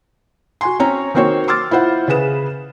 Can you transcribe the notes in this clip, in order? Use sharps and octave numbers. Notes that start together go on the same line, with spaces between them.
F#4 G#5 C6
C4 C#4 C#5 A#5
D#3 A#3 C4 F#4 C5 C#5
C6 D6 E6 F6 A6
E4 F4 C5 F#5
C#3 G#4 B4 E7